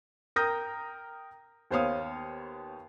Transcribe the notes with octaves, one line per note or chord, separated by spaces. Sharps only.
A#4 G5 A#5 D#6 G6 A#6
D#2 B3 C5 C#5 F5 D#6